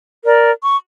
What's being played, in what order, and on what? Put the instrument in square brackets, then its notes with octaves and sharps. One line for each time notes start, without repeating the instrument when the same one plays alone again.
[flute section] A#4 D5
C#6